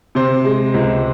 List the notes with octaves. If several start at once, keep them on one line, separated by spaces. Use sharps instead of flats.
C3 C5
G#3
C#2